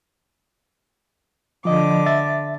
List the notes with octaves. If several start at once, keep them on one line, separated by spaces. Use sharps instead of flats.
D3 F3 D#5 D6
E5 A6